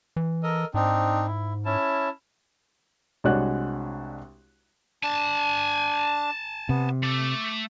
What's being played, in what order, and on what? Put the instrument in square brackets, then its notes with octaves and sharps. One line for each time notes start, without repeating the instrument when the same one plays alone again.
[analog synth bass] E3
[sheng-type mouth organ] A4 A#4 D#5
[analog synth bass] G#2 [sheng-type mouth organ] C4 D4 D#4
[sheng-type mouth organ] E4
C#4 E4 A5
[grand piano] C2 G#3 D4 F#4 C#5 F#6
[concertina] D4 [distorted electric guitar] G#5 A5
[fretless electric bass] C3 [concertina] B3
[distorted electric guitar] A3 [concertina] D6